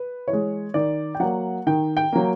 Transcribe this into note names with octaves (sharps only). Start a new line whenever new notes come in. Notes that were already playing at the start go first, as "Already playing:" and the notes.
Already playing: B4
E3 C#5
G#3
D#3 D5
G5
F#3 A#3 F#5
D#3 G5
G5
F#3 A#3